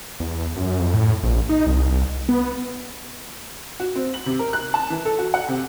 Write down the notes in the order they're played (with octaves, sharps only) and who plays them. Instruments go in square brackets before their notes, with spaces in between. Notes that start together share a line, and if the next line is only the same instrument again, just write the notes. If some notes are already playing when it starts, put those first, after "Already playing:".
[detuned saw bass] E2
F#2
F2
A2
A#1
D#4
C2
B3
[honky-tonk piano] F#4
C4
F#7
C3
A#4
F#6
A5
E3
A4
F#4
F#5
C3